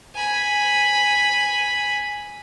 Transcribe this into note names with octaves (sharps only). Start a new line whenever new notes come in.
G#5 B5